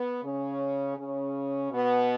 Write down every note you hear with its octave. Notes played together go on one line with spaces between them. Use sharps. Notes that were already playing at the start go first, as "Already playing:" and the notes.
Already playing: B3
C#3 C#4
C#3 C#4
B2 B3